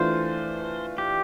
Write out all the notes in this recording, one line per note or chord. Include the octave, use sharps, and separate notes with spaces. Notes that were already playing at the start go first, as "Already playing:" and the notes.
Already playing: E3 A3 D4 F4 C5
G4